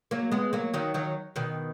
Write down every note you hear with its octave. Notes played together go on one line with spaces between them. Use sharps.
F#3 A#3
G#3 B3
F#3 A#3
D#3 F#3
D#3 F#3
B2 D#3